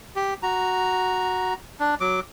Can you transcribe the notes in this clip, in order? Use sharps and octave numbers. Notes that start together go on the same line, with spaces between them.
G4
F#4 A#5
D4
F#3 D6